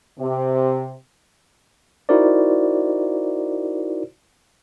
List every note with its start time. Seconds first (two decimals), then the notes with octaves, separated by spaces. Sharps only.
0.19 C3
2.09 D#4 E4 F#4 A#4 C5 D5